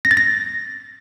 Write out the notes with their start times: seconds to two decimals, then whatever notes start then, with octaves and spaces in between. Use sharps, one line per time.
0.05 A#6
0.11 A6
0.17 A#6